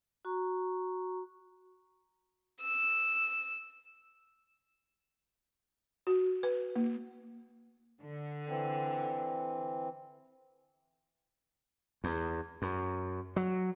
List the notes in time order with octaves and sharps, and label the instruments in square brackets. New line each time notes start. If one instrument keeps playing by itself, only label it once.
[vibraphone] F#4 A#5 C#6
[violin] E6
[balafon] F#4
B4
A#3
[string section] D3
[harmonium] E3 C4
[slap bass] E2
F#2
F#3